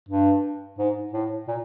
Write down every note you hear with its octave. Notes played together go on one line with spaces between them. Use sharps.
G2
G#2
A2
A#2